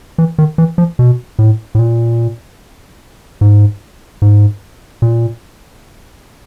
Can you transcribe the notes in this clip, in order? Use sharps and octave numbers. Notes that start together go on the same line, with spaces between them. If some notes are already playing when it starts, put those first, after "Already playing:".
E3
D#3
E3
F3
B2
A2
A2
A#2
G#2
G#2
A#2